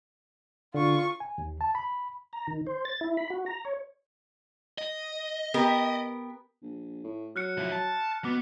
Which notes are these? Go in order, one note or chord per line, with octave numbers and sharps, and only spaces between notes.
D3 F4 C#6
G#5
D#2
A5
B5
A#5
D#3
C5
A6
E4
B5
F#4
A#5
C#5
D#5
B3 G4 A#4
A#1
A2
F#3 F6 F#6 C#7
F3 E4
A5
B2 B3 D6